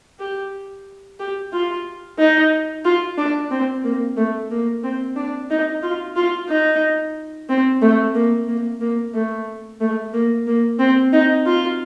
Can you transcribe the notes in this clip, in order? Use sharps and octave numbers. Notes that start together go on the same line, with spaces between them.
G4
G4
F4
D#4
F4
D4
C4
A#3
A3
A#3
C4
D4
D#4
F4
F4
D#4
C4
A3
A#3
A#3
A#3
A3
A3
A#3
A#3
C4
D#4
F4